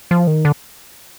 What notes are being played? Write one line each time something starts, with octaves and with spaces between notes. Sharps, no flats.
F3
D#3
D3